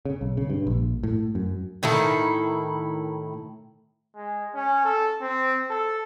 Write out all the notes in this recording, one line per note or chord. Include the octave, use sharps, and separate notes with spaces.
C#3
B1
C#3
G2
A#1
A2
F#2
A2 D#3 E4 A4
G#3
C#4
A4
C4
A4